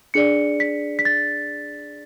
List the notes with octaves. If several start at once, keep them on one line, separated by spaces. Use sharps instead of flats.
D4 G#4 D5 C#7
B6
B6
A6